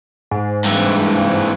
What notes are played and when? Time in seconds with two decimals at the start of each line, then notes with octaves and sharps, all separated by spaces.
0.31 G#2
0.65 G2 E3